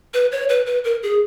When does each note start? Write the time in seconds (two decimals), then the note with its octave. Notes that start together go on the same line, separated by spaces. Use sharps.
0.14 B4
0.32 C#5
0.49 B4
0.66 B4
0.84 A#4
1.03 G#4